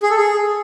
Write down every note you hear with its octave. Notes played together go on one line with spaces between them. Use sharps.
G#4
A4
G#4